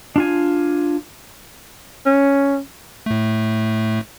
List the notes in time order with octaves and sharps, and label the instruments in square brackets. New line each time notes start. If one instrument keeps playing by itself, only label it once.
[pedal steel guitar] D4 F4 G#5
[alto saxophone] C#4
[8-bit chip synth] A2 A3